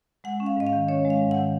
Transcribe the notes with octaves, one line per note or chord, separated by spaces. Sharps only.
G#3 F#5
C#4
F5
G#2 D#5
F5
D#3
C#4 C#5
G#3
F5
G#2
F#5
D#3